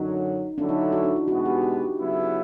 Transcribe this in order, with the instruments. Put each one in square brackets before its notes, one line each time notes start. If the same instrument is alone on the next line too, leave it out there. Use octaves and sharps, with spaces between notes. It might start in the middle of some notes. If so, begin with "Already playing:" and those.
Already playing: [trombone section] F#2 D3 F#3 [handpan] D#4
[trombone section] D3 F#3 A3 C#4 E4 [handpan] D4
[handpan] D#4
F#4
D4
E4
[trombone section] B2 G#3 B3 [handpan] F#4
[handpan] G4
G4
[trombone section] C#3 F#3 B3 E4